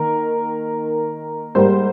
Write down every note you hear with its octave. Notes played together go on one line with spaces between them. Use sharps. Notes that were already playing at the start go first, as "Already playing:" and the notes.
Already playing: D#3 A#3 A#4
G#2 G3 A#3 C5